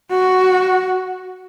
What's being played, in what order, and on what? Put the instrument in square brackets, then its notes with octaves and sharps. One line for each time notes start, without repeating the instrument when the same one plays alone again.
[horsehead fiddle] F#4